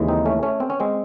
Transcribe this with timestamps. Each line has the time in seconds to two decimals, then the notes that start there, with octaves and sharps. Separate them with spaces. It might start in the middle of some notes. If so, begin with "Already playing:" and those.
Already playing: D#2 C#3 E3 G#3
0.08 C4 D#4
0.26 A3 C#4
0.43 A3 C#4
0.60 C4
0.70 C#4
0.80 G#3 C4